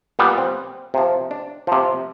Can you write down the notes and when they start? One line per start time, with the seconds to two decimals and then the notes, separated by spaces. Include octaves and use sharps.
0.19 A#2 G3 B3
0.38 C4
0.94 C3 F3
1.31 D4
1.67 C3 F3